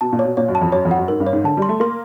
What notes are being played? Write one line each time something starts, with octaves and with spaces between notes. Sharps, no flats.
B2 A5
A#2
C#5
B2
A#2 C#5
F#2
A5
F2
F#2 C#5
F2
F#5
F#2
G#2 A#4
G2
C#5
G#2
D3 A5
G3
C6
A3
A#3 C6